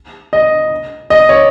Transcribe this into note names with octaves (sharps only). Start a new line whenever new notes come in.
D#5
D#5
C#5